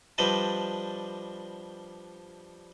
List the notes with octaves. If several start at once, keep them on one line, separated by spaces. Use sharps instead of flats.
F3 G3 D4 B4 D#5 A5